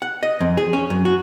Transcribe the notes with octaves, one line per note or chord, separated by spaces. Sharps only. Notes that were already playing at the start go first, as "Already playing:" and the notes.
F#5
D#5
F2
G#4
C#4
F#2
F#4